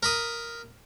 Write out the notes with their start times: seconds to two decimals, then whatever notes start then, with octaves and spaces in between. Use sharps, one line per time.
0.03 A#4 B5 D#6